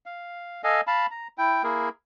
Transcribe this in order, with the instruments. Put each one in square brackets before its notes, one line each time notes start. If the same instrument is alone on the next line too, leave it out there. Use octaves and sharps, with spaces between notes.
[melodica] F5
A4 D#5 F5 G#5
F5 A5 B5
A#5
E4 G5
A#3 E4 G#4 A#4